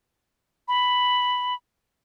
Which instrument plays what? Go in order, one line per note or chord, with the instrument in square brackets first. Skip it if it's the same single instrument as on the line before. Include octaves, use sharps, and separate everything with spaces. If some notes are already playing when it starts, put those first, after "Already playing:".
[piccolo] B5